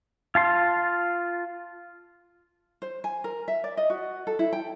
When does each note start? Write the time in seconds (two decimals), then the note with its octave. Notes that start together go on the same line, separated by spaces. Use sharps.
0.35 F4 A5 C6
2.82 C5
3.04 G#5
3.24 A#4
3.48 E5
3.64 D5
3.77 D#5
3.90 F#4
4.27 A4
4.39 E4
4.53 G5